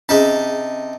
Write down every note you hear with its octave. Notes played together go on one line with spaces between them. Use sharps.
C3 C#4 D#4 G#4 A5